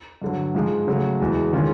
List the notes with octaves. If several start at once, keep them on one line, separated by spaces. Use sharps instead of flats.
G2 D3 F#3
G#2 F3 G#3
C#3 F#3 A3
E2 B2 G#3
D#3 G#3 C#4 F4